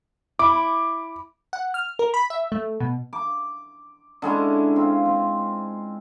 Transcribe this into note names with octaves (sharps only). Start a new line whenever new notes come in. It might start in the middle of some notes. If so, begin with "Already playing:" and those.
E4 D6
F#5
F6
A#4
B5
E5
A3
B2
D6
D3 G#3 C#4 E4
C4 F4
C4